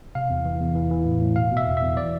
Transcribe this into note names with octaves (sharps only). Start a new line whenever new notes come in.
C3 F5
E2
E3
E2
E3
E3
A2
A2
B2 F5
B2
E5
E2
E5
E2
E3 D5